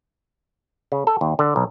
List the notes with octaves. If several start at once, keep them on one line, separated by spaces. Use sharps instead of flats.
C#3
A4
D#2
D3
B1